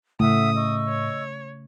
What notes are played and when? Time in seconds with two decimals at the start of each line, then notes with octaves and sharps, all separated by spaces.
0.20 A2 C#3 A3 E5 F#5 D#6 E6
0.55 D#5 C#6 E6
0.88 C#5